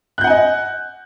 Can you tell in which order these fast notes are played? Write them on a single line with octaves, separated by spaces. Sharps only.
F#6 G6 F#5 G#5 D#5